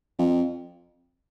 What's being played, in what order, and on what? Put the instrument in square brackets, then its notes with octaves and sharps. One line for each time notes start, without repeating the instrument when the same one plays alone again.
[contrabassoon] F2